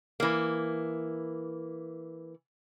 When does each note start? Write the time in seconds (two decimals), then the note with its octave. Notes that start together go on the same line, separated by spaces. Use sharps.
0.20 E3 A#3